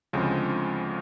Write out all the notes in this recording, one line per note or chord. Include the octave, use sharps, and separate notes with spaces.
D2 C#3 F3 G#3 C4